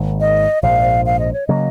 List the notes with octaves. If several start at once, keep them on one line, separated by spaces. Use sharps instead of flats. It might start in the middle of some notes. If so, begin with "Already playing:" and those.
Already playing: G#1 G#2 D#3 A#3
D#5
A#1 G#2 F3 F5
F5
D#5
C#5
C#3 F#3 A#3 D#5